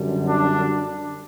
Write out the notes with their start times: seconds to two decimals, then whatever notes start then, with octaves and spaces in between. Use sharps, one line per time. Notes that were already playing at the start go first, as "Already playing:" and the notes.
Already playing: F#2 D3 G3
0.26 D4